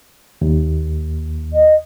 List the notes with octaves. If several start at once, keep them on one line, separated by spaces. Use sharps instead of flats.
D#2
D#5